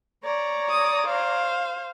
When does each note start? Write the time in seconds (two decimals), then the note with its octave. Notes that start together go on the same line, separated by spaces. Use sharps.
0.24 C#5 D5 A#5
0.70 D#6
1.05 C5 F5